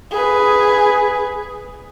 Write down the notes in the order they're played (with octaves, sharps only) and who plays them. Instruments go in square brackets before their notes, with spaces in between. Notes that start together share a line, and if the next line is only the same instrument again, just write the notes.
[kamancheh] G#4 B4